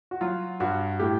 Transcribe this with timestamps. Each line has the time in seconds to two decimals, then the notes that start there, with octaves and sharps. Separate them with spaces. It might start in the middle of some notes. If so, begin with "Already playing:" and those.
0.11 F#4
0.21 F#3 F4
0.60 G2 F#4
1.00 A2 G4